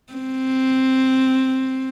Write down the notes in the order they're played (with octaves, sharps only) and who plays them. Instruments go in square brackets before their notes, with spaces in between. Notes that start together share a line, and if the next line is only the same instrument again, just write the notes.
[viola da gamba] C4